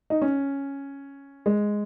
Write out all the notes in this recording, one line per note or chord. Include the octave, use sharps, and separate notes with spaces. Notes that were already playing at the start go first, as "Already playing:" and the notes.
D#4
C#4
G#3